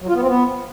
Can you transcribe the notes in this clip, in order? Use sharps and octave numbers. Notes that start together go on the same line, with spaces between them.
F#3
F4
B3
C4
B3